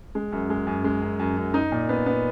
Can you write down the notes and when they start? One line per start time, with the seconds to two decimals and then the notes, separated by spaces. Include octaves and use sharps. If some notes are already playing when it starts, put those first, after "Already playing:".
0.15 G#3
0.32 F#2
0.50 G#3
0.67 F#2
0.84 G#3
1.02 F#2
1.19 F#2
1.37 F#2
1.54 D#4
1.72 A#2
1.89 B3
2.06 B3